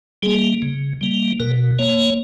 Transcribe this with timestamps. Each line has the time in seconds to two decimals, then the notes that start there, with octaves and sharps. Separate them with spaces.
0.23 G3 A#3 G#4
0.62 C#3
1.01 G3 A#3
1.40 B2 A#4
1.79 A#3 C#5